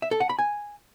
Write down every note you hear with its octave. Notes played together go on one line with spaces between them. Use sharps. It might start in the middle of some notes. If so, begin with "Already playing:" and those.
E5
A4
F#5
B5
G#5